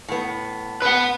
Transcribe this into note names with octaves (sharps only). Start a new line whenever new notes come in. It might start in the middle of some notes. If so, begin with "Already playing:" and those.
A2 B3
B4 F#5